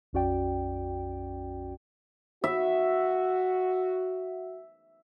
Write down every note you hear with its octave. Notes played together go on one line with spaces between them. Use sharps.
A#1 F2 C#4 F#4 D5 G5
F#4 E5